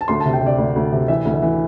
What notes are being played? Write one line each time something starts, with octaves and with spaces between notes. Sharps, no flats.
A5
D2 C6
A5
C3
G5
C3 D5
D2
D2
C3
E3 E5
D2
E5
E3